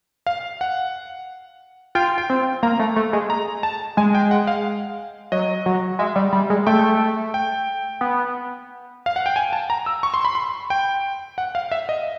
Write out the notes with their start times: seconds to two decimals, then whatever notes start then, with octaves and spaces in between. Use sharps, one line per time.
0.27 F5
0.61 F#5
1.95 F4 G5
2.18 G5
2.30 C4
2.63 A#3 A#5
2.79 A3
2.96 A3
3.13 G#3
3.30 A#5
3.63 A5
3.97 G#3 G#5
4.15 G5
4.31 F#5
4.47 F5
5.32 F#3 D#5
5.66 F#3
5.99 G#3 E5
6.16 G3
6.33 G3
6.50 G#3
6.67 A3 G5
7.34 G5
8.01 B3
9.06 F5
9.16 F#5
9.26 G5
9.36 G#5
9.53 A5
9.70 A#5
9.86 E6
10.03 C#6
10.14 C6
10.25 B5
10.35 C6
10.70 G5
11.38 F#5
11.55 F5
11.71 E5
11.89 D#5